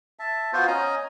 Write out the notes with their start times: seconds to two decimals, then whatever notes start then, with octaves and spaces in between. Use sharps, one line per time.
0.19 E5 A5
0.53 B3 F4 F#4 C5
0.68 C#4 D#5 G#5 A#5